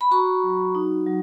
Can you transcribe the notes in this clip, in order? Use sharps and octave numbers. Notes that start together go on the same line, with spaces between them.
B5
F#4 A#5 C#6
F#3
D#4
F#3